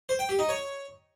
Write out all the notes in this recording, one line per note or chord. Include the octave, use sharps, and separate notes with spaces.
C5
G5
G4
D#4
C#5